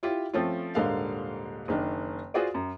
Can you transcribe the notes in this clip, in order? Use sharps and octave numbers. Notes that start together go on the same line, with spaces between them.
E4 F4 G4
F3 A3 C4 C#4 F4
D#1 G#2 D3 A#4 F5
F#1 D#3 D4
F4 F#4 G#4 C5 D5
F#2